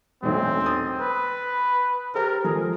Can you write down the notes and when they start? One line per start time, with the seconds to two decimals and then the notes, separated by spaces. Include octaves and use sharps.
0.22 E1 B1 A3 C4
0.66 D#6 A6
1.00 B4
2.15 G4 A4 A#4 C5
2.44 F3 G#3 G#4